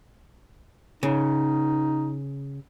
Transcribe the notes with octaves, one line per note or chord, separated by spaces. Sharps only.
C#3 D#4